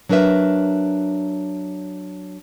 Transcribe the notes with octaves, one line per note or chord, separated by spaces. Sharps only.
F#3 D4 A#4 B4 E5